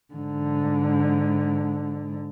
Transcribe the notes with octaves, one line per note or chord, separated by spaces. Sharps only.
G#2 D3